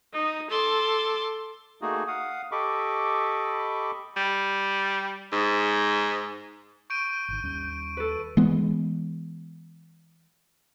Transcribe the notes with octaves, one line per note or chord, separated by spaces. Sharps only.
D#4
A4 C6 D6
A3 A#3 D#4 F#4 G#4
F5 F#5 D#6
G4 A4 D#5 B5 C#6 D6
G3
G#2
C#6 G6 D7 D#7
G#1 D#3
D#2 G3 C#4
A4 B4
E3 G#3 B3